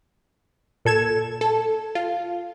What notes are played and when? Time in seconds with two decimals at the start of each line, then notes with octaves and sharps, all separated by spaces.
0.85 A#2 A4 G#6 E7
1.41 A4
1.95 F4